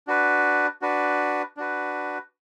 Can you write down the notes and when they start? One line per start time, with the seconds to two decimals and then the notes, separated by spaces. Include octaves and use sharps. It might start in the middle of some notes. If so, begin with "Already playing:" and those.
0.07 D4 F#4 B4
0.82 D4 F#4 B4
1.57 D4 F#4 B4